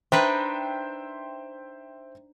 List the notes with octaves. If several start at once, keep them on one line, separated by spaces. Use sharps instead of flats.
D4 D#4 B4 C5 E5 G5